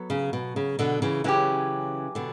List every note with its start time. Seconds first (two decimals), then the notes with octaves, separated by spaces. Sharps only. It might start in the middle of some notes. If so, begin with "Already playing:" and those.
Already playing: F#3 B3 A4
0.10 C#3
0.33 B2
0.56 C#3
0.79 B2 D3
1.02 C#3 E3
1.24 C#3 E3 F#3 C#4 G4
2.15 B2 D3